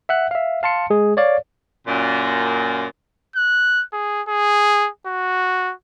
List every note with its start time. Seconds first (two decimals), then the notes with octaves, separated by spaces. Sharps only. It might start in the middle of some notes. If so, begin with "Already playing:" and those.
0.09 E5 F#5 F#6
0.31 E5 F5
0.63 F5 A5 C6 C#7
0.90 G#3 G#4
1.17 C#5 D5 F5
1.87 F#2 A#2
3.36 F#6
3.93 G#4
4.28 G#4
5.07 F#4